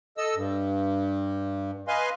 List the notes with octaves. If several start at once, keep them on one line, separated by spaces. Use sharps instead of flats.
A4 D#5 E6
G2
B4 D#5 F5 G#5 C6